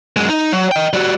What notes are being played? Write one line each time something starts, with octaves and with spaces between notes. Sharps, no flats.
F#2 G#3
D#4
F#3
D#5 G5
G3 F#4